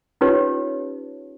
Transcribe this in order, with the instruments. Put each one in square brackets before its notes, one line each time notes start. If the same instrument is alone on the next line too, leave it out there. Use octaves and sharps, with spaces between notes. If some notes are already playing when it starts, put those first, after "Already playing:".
[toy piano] C#4 D#4 F4 G4 B4 C#5